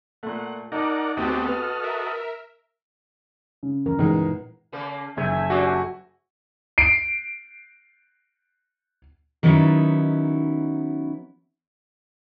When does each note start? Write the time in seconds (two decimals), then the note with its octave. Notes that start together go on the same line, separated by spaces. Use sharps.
0.23 A#2 A3 F#5
0.72 D#4 A#4 D5 F#5 A5 D6
1.17 D2 B3 C4 F#4 G4 A4 D#5
1.47 B4 F6
1.84 A#4 E5
3.63 C#3
3.86 E3 F3 C#4 A#4
3.99 C#2 G2 A#2 E3 G#3 B3 D#4
4.72 C#3 A3 A#3
5.17 F#1 A3 E5 G#5 G#6
5.50 C#4 D4 F#4 G4
6.78 C7 D7
9.43 D#3 F#3 B3 C#4 D#4 E4